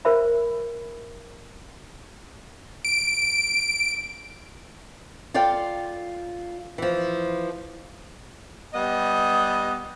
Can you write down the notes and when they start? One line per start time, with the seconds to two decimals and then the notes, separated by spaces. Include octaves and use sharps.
0.05 F4 A#4 C5 E5 B5
2.85 D7
5.34 F4 A4 D5 F5 G5
6.78 E3 F3
8.74 G3 B3 D#5